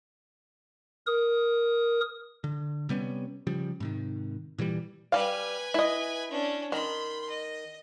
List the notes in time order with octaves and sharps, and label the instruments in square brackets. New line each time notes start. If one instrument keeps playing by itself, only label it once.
[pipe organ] A#4 D#6
[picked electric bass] D3
C3 G3 B3 C#4
C#3 F3 G3
G#2 C3 D#3
A#2 E3 F3 G3
[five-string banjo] G3 F5 [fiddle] B4 G#5
[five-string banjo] E4 D#5
[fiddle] C#4 D4
[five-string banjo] D#3 [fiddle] B5 C6
[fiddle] D#5